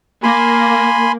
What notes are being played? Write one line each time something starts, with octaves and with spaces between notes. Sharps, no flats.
A#3 G#5 B5 C6